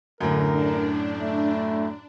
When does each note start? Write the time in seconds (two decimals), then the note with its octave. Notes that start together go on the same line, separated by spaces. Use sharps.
0.20 F#2 A2 D3 A#4
0.53 D4
1.13 A3